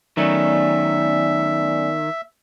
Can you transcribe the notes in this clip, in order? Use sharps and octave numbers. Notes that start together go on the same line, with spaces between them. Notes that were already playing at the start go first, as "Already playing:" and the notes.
D#3 F#3 A3 B3 C#4 D5 E5 G#5